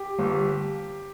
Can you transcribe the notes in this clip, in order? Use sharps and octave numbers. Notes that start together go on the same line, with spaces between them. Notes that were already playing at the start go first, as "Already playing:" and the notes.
Already playing: G4
G1